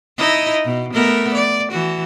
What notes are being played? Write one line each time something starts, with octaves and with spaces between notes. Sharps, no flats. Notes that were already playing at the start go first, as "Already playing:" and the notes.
D#4 E4 D#5
B2
A3 B3 A#4
D5
E3 F#4